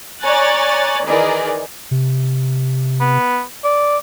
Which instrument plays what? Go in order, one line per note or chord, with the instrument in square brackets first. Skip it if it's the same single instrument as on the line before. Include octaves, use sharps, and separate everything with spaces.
[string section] C#5 D5 G#5 A#5 F#6 A6
D#3 E3 G#4 A#4 D5 D#5
[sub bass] C3
[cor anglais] B3
D5